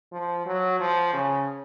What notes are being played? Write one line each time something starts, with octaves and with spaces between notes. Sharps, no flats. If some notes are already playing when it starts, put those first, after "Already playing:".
F3
F#3
F3
C#3